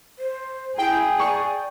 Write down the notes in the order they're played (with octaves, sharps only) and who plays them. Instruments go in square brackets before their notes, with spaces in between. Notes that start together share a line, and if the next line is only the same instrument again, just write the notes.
[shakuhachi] C5
[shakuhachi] E4 [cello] G#4 [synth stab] G5
[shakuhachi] D5 [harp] C#6